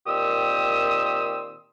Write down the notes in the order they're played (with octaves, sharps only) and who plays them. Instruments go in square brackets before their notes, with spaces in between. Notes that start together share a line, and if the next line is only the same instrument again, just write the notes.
[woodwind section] A#2 D#3 C4 G4 D#6 E6